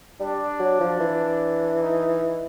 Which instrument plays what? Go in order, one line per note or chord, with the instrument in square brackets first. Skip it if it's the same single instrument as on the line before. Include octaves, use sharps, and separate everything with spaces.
[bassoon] G3 [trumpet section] D4
[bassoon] F#3
F3
E3
[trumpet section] D#4